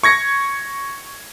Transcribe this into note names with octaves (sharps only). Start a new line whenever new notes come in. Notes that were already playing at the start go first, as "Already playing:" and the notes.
C#6 G#6 A#6 C#7